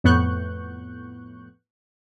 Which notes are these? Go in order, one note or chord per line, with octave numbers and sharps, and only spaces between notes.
F2 A2 B3 C#6 F#6 G6